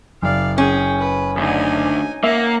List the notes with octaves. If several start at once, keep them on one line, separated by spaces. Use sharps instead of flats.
F#1 D5 F5
C#4 G#4 G5
B4
D2 D#4 G#5
A#3 E5 F#5